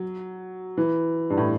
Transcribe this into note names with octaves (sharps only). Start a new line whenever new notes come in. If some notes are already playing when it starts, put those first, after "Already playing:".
Already playing: F#3
E3
G2
A2